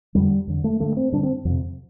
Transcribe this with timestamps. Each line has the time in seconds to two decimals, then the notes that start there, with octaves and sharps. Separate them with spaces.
0.15 F2 D3 G3
0.47 F2 D3
0.64 A3
0.80 G2 D3 A3
0.97 C4
1.12 G2 D3 D4
1.23 C4
1.45 F2 C3